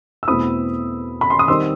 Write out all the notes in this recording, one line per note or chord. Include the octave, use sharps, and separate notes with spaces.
E6
E2 B2 A3 C4 E4 B5 D#6
B5
C6
D#6
D#3 G3 C4 D#4 C6 E6